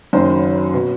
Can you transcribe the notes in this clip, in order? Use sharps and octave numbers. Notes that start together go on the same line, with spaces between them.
F#1 F#2 D#3 C5
B2